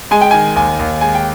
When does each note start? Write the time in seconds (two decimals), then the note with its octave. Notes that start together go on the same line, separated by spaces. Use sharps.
0.11 G#3 G#5
0.21 G5
0.31 D#3 G#5
0.56 D#2 G#5
0.79 D#2
1.01 G#3 G#5
1.15 G5